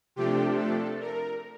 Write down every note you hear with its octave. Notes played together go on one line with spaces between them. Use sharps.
C3 F3 A3 D4 G4
A4
A#4